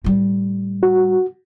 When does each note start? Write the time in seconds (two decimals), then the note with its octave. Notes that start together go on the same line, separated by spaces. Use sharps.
0.04 A2 G3
0.83 F#4